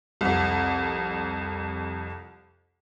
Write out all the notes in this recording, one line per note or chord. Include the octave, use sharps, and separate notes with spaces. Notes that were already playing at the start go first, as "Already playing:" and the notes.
C2 F2